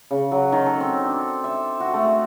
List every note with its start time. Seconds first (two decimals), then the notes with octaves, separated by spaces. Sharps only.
0.11 C#3
0.32 F#3
0.52 D#3
0.66 A4
0.80 C4
1.05 D4
1.44 E5
1.80 F#4
1.94 A3